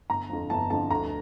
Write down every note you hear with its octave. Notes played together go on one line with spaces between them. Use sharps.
G1 A#5
F2 D3 F3
G1 A5
F2 D3 F3 A5
D2 A#5